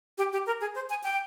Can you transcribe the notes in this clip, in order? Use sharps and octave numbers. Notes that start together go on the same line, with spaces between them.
G4
G4
A#4
G#4
C5
G#5
G5